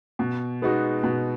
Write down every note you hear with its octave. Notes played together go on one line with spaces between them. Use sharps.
B2
G#3 B3 D#4 F#4
B2